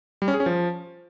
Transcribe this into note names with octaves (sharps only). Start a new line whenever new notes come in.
G3
C#4
G#4
C#4
F3